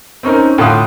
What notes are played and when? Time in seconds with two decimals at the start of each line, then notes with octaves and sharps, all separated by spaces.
0.23 C4 C#4 D#4 A#4
0.58 A2 D3 F4 C6 D#6 F#6